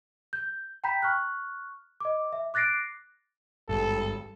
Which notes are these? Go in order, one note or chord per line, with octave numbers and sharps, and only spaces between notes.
G6
G5 A#5 B5 G6 B6
C#6 F6 F#6
D#5 D6
E5
D6 F#6 A6 A#6 C7 D7
G#1 G2 A4